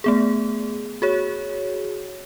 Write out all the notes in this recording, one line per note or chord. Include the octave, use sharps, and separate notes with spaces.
A3 B3 G#4
F#4 G#4 C#5